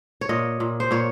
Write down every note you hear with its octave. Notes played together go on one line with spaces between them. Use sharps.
C#5
A#2 D#5
A#2
C5
A#2 C#5